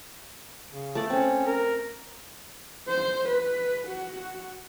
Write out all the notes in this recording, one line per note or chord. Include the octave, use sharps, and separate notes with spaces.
C#3
A3 D5
C4 C#4
A#4
C5
B4
F#4